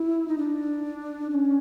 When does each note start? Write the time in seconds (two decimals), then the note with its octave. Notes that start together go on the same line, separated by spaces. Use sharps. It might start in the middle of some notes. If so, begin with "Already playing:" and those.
Already playing: E4
0.28 D#4
0.38 D4
1.30 D4
1.34 C#4